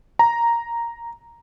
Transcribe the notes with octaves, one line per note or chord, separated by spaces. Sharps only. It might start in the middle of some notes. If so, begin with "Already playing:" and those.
A#5